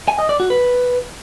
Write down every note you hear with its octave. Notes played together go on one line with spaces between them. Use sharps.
G#5
D#5
D5
F#4
B4